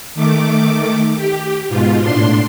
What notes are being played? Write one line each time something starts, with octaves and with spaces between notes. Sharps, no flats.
D#3 A3 D6
G4
G#2 B2 F4
A2 D4 C6